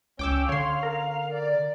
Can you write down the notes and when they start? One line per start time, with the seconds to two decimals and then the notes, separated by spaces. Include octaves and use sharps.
0.19 C#2 C#4 G5 D6 E6
0.49 D3 C#5 F5 C6
0.83 A#4
1.33 D5